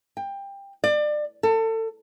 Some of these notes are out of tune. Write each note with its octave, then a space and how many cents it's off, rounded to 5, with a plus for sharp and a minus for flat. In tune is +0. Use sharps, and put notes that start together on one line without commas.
G5 +20
D5 +30
A4 +30